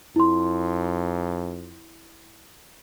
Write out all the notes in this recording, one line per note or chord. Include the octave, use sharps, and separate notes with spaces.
F2 E4 C6